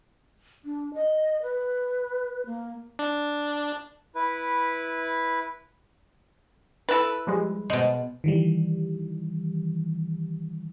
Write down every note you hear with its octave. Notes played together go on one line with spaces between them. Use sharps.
D4
D#5
B4
A#3
D4
E4 B4
E4 A4 B4 E6 A6
F3 G3 G#3
B2 G#3 C5
D#3 E3 G3